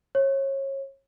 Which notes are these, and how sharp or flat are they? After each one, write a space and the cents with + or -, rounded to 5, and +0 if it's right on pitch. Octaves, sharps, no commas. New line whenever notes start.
C#5 -30